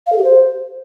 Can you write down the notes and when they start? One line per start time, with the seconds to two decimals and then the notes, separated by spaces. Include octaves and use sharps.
0.06 F5
0.12 A4
0.18 G4
0.24 C5